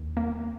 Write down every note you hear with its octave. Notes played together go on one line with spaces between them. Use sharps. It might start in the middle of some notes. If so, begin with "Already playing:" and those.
Already playing: D#2
A#3